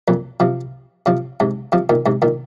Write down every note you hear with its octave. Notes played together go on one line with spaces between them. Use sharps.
F2 A#2
C3 F3
C3 F3
G#2 C3
C3 F3
A#2 D#3
G#2 C3
A#2 D#3